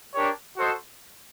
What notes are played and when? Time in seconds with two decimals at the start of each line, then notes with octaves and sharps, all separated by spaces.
0.14 D4 G4 A#4 C#5
0.56 F#4 A4 C5 D#5